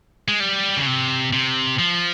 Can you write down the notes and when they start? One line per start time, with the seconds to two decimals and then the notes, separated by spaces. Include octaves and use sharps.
0.28 G#3
0.40 G3
0.77 C#3
0.86 C3
1.33 C3
1.79 F3